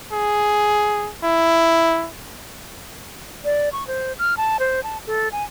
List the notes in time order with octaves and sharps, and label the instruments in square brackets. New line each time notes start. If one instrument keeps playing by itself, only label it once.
[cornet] G#4
E4
[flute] D5
C#6
C5
F6
A5
C5
A5
A4
G#5